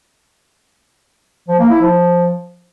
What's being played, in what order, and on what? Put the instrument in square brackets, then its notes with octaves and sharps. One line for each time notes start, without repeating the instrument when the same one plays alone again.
[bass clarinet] F3
A#3
E4
F3